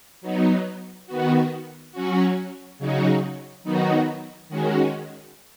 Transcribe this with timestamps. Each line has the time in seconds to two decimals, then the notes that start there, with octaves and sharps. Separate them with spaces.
0.21 F#3 B3 D#4
1.07 D#3 B3 F#4
1.92 F#3 C#4 F#4
2.79 C#3 F#3 D#4 F#4
3.64 D#3 F#3 B3 D#4 F#4
4.49 D#3 G#3 C#4 F#4